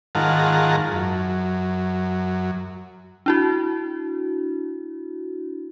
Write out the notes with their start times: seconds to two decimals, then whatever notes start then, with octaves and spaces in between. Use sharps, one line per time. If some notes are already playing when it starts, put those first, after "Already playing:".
0.15 G#2 D#3 F4 A#4 F#5 A5
0.92 F#2
3.26 D4 E4 F#4